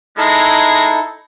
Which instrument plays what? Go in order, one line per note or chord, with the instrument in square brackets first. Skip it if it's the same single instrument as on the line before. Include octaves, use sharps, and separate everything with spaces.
[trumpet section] G#3 [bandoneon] D#4 E4 A4